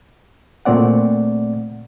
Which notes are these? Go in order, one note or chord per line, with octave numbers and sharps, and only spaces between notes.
A#2 A3 C4 D5 F#5